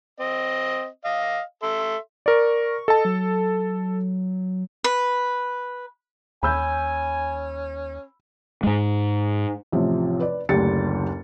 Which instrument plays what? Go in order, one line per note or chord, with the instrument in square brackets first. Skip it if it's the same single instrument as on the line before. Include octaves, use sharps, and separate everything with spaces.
[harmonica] C4 D#5
D#5 F5
A4 E5 C6
[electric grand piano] A#4 D5 [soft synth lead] C#6
[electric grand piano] A4 A5 [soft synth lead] D#5
[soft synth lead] F#3
[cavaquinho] B4
[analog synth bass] D#2 [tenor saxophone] C#4 [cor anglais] G#5 [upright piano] B5 E6 G6
[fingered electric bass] G#2 G#3
[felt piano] A1 C3 F3
B4 D5
F#1 D2 D4 G4 A6 C#7